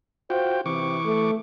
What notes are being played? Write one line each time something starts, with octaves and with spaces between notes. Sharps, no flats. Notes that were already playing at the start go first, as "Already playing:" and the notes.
F4 F#4 C5 G5
C3 E3 C#6 D6
A3